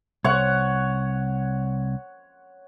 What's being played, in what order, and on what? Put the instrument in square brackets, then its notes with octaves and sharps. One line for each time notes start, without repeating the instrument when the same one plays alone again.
[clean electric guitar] C2 [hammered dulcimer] C#5 F#5